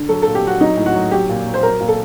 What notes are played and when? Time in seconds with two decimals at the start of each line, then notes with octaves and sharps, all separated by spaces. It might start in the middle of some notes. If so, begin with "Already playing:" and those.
Already playing: D3
0.09 F#3 A4
0.22 A#2 A4
0.35 G4
0.44 F#3 F#4
0.60 F#3 D#4
0.77 A2
0.86 F#4
0.95 F#3
1.11 F#3 G4
1.29 A#2
1.46 F#3
1.54 C5
1.63 F#3 A#4
1.80 A#2
1.88 A4